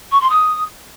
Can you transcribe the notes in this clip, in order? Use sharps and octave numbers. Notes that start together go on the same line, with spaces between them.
C#6
C6
D#6